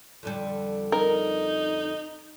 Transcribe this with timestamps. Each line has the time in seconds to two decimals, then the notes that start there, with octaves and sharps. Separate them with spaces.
0.23 F2 D3 G3
0.92 D#4 A#4